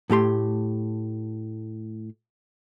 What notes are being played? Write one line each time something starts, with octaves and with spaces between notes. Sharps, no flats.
A2 A3 G4 C6